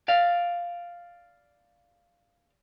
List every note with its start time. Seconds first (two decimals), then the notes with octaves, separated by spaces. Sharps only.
0.08 D5 F5